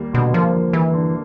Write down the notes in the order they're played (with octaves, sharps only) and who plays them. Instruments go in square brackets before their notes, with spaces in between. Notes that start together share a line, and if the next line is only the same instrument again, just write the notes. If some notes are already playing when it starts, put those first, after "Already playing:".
Already playing: [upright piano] D#2 G3 A#3
[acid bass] B2 [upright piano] D3
[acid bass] F3 [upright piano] A#3
[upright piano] D#2
[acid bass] E3 [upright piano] G3
[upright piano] D3